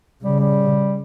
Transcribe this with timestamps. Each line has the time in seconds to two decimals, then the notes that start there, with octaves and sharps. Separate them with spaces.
0.24 C#3 G3
0.39 G3